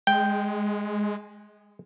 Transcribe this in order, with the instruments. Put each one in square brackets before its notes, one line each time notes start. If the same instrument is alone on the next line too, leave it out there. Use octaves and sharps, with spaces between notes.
[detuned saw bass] G#3 [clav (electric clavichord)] G5